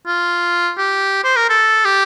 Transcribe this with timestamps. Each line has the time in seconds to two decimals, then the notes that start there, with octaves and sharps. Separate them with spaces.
0.06 F4
0.78 G4
1.24 C5
1.36 A#4
1.50 A4
1.85 G4